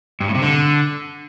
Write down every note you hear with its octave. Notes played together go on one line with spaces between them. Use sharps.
G2
A2
C3
D3